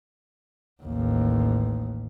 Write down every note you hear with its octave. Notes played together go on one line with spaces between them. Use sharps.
A1 D#2